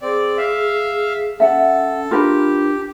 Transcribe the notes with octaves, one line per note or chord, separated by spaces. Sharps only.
C4 G#4 D5
E5 F5
C#4 A4 E5 F#5
D4 F4 G4 A#4 B4